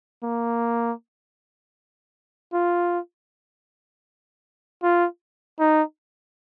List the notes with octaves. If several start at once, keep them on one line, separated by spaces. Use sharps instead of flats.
A#3
F4
F4
D#4